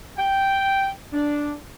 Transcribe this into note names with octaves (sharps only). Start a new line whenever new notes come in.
G5
D4